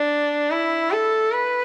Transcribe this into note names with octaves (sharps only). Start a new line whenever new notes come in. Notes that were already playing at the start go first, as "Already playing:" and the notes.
Already playing: D4
E4
A4
B4